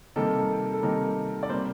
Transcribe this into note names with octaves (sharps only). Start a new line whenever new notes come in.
C3 D#3 G3 A#3 A4
A4
C3 D#3 G3 A#3 A#4
D5
C3 G3 A#3 C5